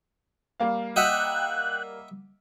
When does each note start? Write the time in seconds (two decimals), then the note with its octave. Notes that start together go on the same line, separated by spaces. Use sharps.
0.60 G3 A#3 F5
0.96 D#5 E5 F#5 G5 F#6